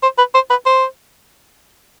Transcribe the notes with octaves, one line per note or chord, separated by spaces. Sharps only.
C5
B4
C5
B4
C5